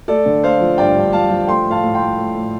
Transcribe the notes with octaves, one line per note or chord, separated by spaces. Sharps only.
A3 A4 D5
D3
A3 C5 F5
F3
G2 D5 G5
G2
F3 F5 A5
F3
A3 G5 C6
A2
F5 A5
A2
G5 C6
A3
A3
A2